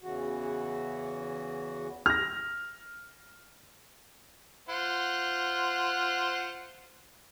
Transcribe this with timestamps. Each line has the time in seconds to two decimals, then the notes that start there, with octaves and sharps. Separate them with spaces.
0.02 E2 C#3 E3 F#4
2.06 F6 A#6
4.69 F4 C5 F#5